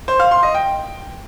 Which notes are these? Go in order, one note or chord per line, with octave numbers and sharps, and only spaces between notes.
C5
F5
C6
D#5
G5